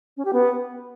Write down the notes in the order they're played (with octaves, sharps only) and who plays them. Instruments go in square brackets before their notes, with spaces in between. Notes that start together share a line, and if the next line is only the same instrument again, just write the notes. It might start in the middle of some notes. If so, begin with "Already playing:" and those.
[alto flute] C#4
G4
B3